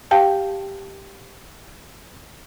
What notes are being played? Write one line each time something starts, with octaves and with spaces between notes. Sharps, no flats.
G4 F5 G5 A5